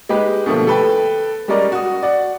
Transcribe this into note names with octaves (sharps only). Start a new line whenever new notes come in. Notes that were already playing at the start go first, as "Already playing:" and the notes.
G#3 D#4 G4 B4
B2 D3 F3 A3 A#3
A4 B4 G5
G3 G#3 C#4 A#4 D5 D#5
F#4 D#6
D5 F#5